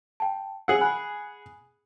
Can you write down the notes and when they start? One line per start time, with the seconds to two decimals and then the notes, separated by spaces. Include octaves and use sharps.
0.20 G5 A5
0.68 G#4 F#5 E6 C7 F#7
0.81 G#5 B5 F#6